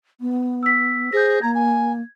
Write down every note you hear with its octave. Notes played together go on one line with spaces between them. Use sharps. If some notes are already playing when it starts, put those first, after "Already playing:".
B3
E6 B6
G#4 C5 G6 A#6
A#3 A#5 G#6
G#5